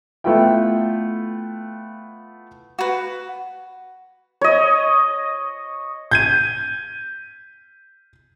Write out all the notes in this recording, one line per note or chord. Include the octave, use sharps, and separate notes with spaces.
A3 B3 E4 F4 F5 G5
F#4 B4
C#5 D#5
G6 G#6 D#7